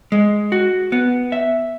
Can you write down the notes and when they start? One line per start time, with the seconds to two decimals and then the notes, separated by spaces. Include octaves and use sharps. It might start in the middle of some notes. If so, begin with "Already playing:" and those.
0.12 G#3
0.52 F#4
0.92 B3
1.32 E5